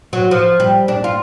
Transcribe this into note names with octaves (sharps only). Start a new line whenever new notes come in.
F#3
F3
G3
D4
F4